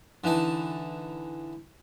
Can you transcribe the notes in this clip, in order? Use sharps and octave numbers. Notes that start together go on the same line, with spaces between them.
D3 E3 D#4 A5